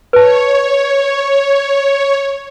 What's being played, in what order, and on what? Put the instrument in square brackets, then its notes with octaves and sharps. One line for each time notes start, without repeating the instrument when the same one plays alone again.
[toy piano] B4 A5 [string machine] C#5